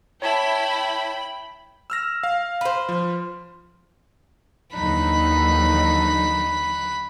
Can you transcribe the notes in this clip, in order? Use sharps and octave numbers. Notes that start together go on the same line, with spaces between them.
E4 C#5 G5 A5 B5
E6 F6 A#6
F5
B4 C5
F3
D#2 D3 E3 F#3 D#4 B5 F#6